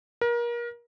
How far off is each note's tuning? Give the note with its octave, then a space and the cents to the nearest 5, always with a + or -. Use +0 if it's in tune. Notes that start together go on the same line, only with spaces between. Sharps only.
A#4 +30